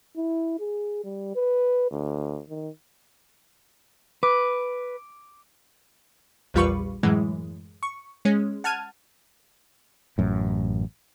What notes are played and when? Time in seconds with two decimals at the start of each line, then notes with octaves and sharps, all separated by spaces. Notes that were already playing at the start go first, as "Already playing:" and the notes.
0.16 E4
0.60 G#4
1.04 G3
1.35 B4
1.91 D2
2.49 D#3
4.23 B4 D6
6.54 A#1 E2 G3 F4 B4 C#6
7.03 F#2 A2 E3 G#3
7.83 C#6
8.25 G#3 C#4
8.64 F#5 A5 F6 G#6 D#7
10.18 A1 F#2 A2